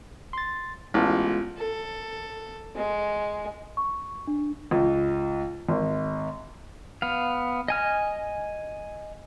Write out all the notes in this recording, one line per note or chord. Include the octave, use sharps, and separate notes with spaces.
C6 A6
A1 G#3 B3 F4
A4
G#3
C#6
D4
C#2
G#1
B3 F5
D#5 G#5 F6